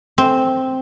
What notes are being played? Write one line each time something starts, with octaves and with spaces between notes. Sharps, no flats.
C4